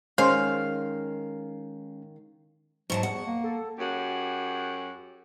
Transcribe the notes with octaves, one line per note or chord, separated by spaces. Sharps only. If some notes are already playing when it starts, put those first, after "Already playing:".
D#3 G#3 C#4 C5 F5 C6
G#2 F3 F#3 A5 C#6
E2 F#5
A#3
A4
F#2 G4 G#4 F#5